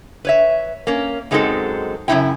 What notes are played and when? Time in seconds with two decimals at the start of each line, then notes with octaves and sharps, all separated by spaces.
0.25 B4 C#5 E5
0.87 A#3 C#4
1.31 F#2 F#3 G#3 C4 D#4 A4
2.08 F#2 C#3 F3 D#4 E4 G5